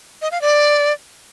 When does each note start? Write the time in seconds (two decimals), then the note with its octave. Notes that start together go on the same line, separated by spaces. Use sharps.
0.22 D#5
0.32 F5
0.41 D5